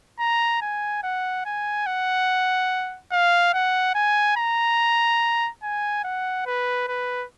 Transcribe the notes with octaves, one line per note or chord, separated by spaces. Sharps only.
A#5
G#5
F#5
G#5
F#5
F5
F#5
G#5
A#5
G#5
F#5
B4
B4